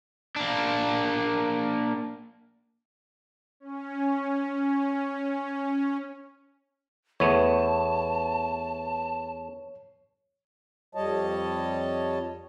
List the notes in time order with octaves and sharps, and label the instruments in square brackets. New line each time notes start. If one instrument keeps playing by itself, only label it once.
[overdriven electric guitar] A#3 D4
[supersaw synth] C#4
C#4
[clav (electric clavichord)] E2 A3 B3 [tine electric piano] C#5 [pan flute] A5
[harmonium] F2 G3 C#5 D#5 A5